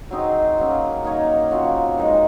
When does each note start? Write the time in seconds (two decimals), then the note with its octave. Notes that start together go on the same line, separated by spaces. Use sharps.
0.11 F#3 C4 D#4 G#4
0.58 F#3 A#3 C#4
1.04 A#3 D#4 A#4 C#5
1.51 C#3 F3 C4 F#4
1.98 D#3 G#3 D#4